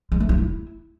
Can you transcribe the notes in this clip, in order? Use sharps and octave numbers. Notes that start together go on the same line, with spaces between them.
G#3
A3
F4
E4